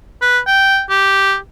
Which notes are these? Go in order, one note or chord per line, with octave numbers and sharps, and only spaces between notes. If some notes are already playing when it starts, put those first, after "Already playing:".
B4
G5
G4